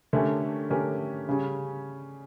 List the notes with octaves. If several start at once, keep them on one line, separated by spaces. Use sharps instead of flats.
D3 A3 C#4 G4 A#4
D3 A3 C#4 G4 A#4
C#3 G3 C#4